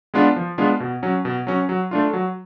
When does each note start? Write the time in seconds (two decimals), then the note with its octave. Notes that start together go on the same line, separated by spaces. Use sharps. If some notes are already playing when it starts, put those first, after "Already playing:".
0.14 G#3 B3 D4 F4
0.36 F3
0.58 G#3 B3 D4 F4
0.80 B2
1.03 F#3 C#4
1.25 B2
1.47 F#3 C#4
1.69 F#3
1.91 A3 D4 F4
2.13 F#3